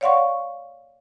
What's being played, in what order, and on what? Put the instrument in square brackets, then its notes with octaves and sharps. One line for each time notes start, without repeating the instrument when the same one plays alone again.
[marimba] C#5 D5 F5 F#5 C6 C#6